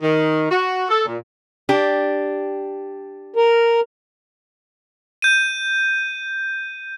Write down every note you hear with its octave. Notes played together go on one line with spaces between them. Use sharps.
D#3
F#4
A4
A#2
D4 G4
A#4
G6 D#7